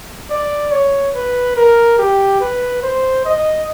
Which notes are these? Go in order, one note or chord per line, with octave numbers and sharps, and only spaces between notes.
D5
C#5
B4
A#4
G4
B4
C5
D#5